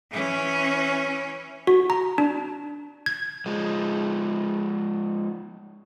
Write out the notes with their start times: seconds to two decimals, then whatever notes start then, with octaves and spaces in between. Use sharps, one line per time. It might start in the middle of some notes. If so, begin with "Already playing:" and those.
0.11 E3 C#4
1.67 F#4
1.90 A#5
2.18 D4
3.06 G#6
3.46 F3 G#3